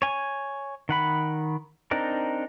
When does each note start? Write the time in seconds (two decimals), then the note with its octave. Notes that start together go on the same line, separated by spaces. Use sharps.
0.02 C#5 G#5
0.89 D#3 F#5 B5
1.91 C4 D4 D#4 A#4